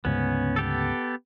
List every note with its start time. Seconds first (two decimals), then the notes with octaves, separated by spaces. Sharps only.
0.05 D2 G#2 C#3 B3 C#4
0.56 B3 G4 A4